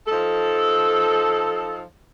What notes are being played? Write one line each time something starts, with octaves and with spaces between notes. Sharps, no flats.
F3 D#4 A4